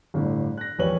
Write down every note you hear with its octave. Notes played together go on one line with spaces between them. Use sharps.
G1 A2 D3
F#6 A#6
E1 A#1 G4 B4 C#5 F#7